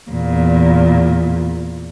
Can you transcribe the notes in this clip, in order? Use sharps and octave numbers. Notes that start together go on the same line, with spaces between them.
E2 A#2